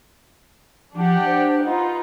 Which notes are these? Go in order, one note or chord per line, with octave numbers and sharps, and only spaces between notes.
F3 D4 G4 F#5
C5
D#4 F4 B4 F#5